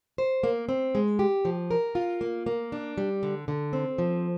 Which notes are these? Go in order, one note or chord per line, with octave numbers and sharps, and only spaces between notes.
C5
A#3
C4
G#3
G4
F3
A#4
F4
A#3
A#3
D4
G3
D3
D3
C4
F3